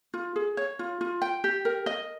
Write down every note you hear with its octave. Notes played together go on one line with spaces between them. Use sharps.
F4
G#4
C#5
F4
F4
G5
G4
A#4
D#5